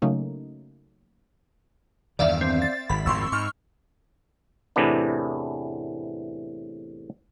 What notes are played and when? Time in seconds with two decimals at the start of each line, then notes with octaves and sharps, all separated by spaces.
0.02 C#3 F#3 A3 A#3 C#4 D#4
2.19 E2 G2 D#3 D5 E5 F5
2.41 C4
2.62 A6
2.90 G#1 B5
3.06 G#1 F2 A#2 C6 C#6 E6
3.32 G#2 C#6 F6
4.76 E2 A2 C3 E3 B3 D4